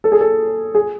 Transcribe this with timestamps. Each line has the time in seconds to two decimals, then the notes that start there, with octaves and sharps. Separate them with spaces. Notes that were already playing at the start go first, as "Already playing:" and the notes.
0.04 A4
0.12 G#4
0.21 A4
0.75 G#4